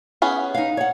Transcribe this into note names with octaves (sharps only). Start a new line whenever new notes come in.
B3 C#4 G#4
D#4 F5
C#5 F#5